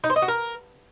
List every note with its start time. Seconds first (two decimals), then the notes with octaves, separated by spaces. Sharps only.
0.04 D#4
0.10 C5
0.16 D#5
0.22 F#4
0.28 A#4